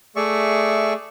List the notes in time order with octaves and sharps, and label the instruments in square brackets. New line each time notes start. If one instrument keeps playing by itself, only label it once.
[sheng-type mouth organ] A3 G#4 D5 E5 C#6